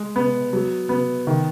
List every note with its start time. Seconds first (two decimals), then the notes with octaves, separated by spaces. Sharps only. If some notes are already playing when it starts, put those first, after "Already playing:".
Already playing: G#3
0.16 B3
0.53 F#3
0.89 B3
1.27 D#3